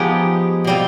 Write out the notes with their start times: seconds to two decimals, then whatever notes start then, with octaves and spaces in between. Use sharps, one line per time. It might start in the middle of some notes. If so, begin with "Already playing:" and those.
Already playing: F3 G#3 B3 D#4 G4
0.65 B2 G3 C4 F4